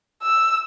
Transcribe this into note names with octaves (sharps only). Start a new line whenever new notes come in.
E6